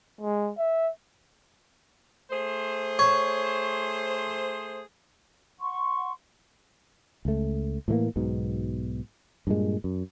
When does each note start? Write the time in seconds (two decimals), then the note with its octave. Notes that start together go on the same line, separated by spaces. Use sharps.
0.21 G#3
0.58 E5
2.31 A3 G#4 C5
2.99 C#5
5.60 F#5 C6 C#6
7.25 C#2 A3
7.88 A2 E3 G3 A#3
8.16 B1 G#2 B2
9.47 G2 A#2 G#3
9.84 F#2